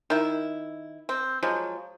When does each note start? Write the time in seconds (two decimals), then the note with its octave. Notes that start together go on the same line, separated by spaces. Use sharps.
0.10 D#3 E4
1.09 C4
1.43 F3 F#3 G#3